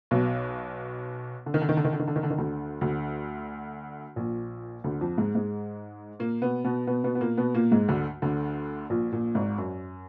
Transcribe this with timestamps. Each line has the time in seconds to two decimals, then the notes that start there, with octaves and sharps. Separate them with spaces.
0.11 B1 B2
1.46 D3
1.54 D#3
1.61 D3
1.69 D#3
1.77 D3
1.84 D#3
1.93 D3
1.99 D#3
2.08 D3
2.16 D#3
2.23 D3
2.30 D#3
2.38 D2 D3
2.81 D2 D3
4.16 A#1 A#2
4.84 D2 D3
5.01 F2 F3
5.18 G#2 G#3
5.35 G#2 G#3
6.19 A#2 A#3
6.42 B2 B3
6.64 B2 B3
6.87 B2 B3
7.04 B2 B3
7.15 B3
7.21 A#2 A#3
7.37 B2 B3
7.54 A#2 A#3
7.72 G#2 G#3
7.88 D2 D3
8.22 D2 D3
8.90 A#1 A#2
9.13 A#1 A#2
9.35 G#1 G#2
9.58 F#2